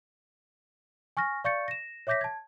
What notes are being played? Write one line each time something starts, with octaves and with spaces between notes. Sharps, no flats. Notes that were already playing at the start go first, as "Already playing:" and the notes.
G#5 C#6 F6 A#6
D5 F5 C#6 G6 A6 C#7
A#6 E7
C#5 E5 D6 G6 A#6 B6
A5 G#6